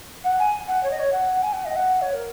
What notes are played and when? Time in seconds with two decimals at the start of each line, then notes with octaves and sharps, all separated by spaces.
0.24 F#5
0.38 G#5
0.67 F#5
0.83 C#5
0.90 D#5
0.99 C#5
1.12 F#5
1.42 G#5
1.52 F#5
1.65 D#5
1.75 F#5
2.01 C#5
2.13 A#4